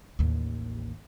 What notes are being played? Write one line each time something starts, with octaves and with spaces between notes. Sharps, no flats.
A1 D#2